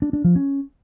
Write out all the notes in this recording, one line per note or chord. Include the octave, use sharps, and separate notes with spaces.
D4
D4
F3
C#4